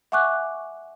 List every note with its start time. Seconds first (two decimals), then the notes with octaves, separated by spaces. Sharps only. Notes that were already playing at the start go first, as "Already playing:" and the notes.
0.12 E5 F#5 G#5 C#6 D6 F#6